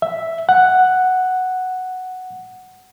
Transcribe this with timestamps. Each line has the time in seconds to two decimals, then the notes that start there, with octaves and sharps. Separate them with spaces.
0.02 E5
0.49 F#5